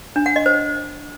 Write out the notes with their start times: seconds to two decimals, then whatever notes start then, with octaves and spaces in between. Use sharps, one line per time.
0.16 D4
0.26 F#5
0.36 D#5
0.46 C5